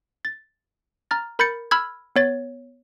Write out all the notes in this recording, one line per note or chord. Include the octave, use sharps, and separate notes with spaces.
A6
A#5 F6 A6
A#4 B5 G6 A6 C#7
B5 E6 F6 G#6
B3 C#5 A6